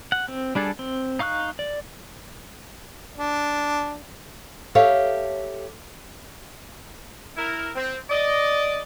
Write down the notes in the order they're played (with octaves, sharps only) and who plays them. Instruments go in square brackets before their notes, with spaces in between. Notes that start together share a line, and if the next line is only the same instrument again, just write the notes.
[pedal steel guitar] F#5
C4
G3 D4 G#4 A4
C4
D#4 F5 C#6 E6 F#6
D5
[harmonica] D4
[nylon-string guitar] G4 A4 C#5 E5 F5
[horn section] E4 A#4
C4
D5 D#5